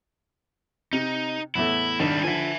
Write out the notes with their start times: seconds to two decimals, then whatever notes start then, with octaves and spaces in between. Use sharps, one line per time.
0.93 C3 D#4
1.55 E2 A2 A3 E4
1.99 G#1 D#3 G3 D4 E4
2.23 D3 F3 E5 G#5